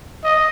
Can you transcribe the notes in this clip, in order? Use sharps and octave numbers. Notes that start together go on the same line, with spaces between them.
D#5